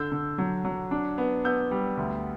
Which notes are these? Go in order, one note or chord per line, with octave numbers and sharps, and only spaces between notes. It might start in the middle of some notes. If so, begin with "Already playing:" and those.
Already playing: D3 E6 G6
D3
F#3
F#3
D4
B3
B3 E6 G6
G3
D2